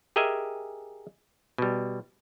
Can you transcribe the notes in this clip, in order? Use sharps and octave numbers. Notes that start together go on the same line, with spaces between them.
G4 G#4 A#4 D#5 E5 G#5
B2 G3